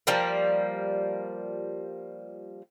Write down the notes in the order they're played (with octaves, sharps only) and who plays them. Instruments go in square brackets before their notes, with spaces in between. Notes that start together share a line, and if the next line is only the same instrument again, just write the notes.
[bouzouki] F3 G3 A#3